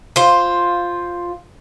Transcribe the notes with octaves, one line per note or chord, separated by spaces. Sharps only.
F4 C5